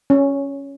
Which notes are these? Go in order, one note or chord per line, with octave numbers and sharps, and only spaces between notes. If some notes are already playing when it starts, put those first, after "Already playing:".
C#4